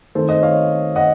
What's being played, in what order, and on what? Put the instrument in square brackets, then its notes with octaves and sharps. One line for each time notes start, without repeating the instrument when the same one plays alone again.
[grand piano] D#3 A3 C4 A4 C5
C5 D#5
C#5 F5
D#5 F#5